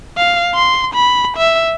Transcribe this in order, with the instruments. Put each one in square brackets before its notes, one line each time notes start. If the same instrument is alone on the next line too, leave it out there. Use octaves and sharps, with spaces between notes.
[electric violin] F5
C6
B5
E5